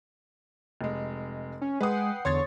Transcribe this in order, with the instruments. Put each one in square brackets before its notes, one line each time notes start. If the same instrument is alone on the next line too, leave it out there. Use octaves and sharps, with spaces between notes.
[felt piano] F1 G#3
[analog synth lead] C#4
[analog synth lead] G#3 [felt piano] B4 D#6 [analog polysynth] F#5 G5 C7
[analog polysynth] E2 D3 [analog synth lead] C#5 [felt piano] C6 G#6 A6